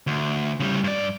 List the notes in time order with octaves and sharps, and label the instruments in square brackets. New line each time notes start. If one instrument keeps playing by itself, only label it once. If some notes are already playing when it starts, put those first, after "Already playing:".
[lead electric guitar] D2
C#3 G3
G2 D5